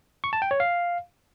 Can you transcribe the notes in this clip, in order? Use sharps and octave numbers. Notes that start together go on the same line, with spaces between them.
C#6
A5
G5
C#5
F5